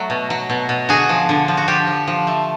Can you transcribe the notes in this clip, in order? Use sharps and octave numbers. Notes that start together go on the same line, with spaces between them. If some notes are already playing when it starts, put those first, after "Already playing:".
Already playing: F#3 A3
B2
F#3
B2
B2
D3 F#4 G#4
F3
D3
F3
F#4
F3 F4 G4
F3
F3
A3